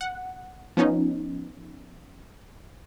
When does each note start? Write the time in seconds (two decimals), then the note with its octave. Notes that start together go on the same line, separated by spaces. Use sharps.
0.01 F#5
0.77 F3 B3 C#4 D#4